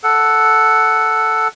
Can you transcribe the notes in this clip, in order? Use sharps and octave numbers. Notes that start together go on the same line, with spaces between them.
A4 F#5